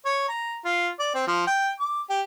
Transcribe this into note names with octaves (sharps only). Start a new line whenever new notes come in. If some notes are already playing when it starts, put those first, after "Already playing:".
C#5
A#5
F4
D5
C4
F3
G5
D6
G4